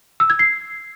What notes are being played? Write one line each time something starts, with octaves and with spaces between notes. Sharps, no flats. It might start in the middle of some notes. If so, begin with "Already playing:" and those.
E6
G#6
C7